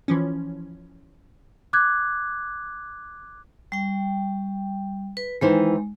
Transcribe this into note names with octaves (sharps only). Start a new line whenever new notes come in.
E3 F3 C#4
D6 F#6 G#6
G3 G5
B4
D#3 E3 G#3 C5